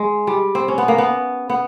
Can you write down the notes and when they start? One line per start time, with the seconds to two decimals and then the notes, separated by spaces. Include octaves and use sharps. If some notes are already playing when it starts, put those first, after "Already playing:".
Already playing: G#3
0.27 G3
0.55 C4
0.68 C#4
0.78 B3
0.88 A#3
0.98 B3
1.50 B3